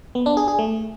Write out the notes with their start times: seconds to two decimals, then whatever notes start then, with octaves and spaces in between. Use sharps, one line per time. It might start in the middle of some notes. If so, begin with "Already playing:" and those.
0.15 B3
0.26 D4
0.37 G#4
0.48 G#4
0.59 A3